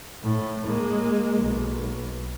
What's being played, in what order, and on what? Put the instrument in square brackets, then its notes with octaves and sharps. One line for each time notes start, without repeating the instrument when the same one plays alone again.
[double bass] A2
G#3 A#3
B1